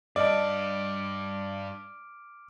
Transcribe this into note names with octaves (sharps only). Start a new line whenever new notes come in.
G2 G4 D5 D#5 A5 D6 F6 D7